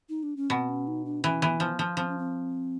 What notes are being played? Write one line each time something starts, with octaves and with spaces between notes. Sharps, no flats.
D#4
D4
C#4
B2 C4
C#4
D#4
D4
E3 C#4
E3 B3
F3 B3
F3
F3 C4
C#4
C4